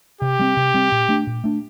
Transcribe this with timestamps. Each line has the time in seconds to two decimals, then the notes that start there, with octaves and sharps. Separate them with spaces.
0.21 C3 G4
0.39 G3 C4
0.57 C3
0.74 G3 C4
0.92 A#2
1.09 A3 D4
1.27 A#2
1.44 A3 D4